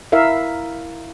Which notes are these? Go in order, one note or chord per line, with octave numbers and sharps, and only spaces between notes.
E4 A#4 E5 F5